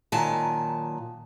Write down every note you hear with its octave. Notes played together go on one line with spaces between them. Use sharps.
A#2 D#3 F#3 G#5 A5